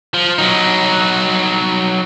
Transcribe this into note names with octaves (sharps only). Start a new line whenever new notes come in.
F3
F#3 D#4